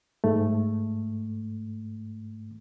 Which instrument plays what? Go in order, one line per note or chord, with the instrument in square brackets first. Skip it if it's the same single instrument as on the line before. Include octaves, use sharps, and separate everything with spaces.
[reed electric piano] G#2 A3